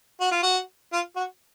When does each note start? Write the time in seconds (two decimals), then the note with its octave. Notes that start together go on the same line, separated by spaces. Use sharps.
0.21 F#4
0.31 F4
0.42 F#4
0.93 F4
1.16 F#4